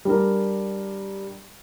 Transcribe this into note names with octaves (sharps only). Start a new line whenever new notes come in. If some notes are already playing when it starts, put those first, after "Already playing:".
G3 D4 A#4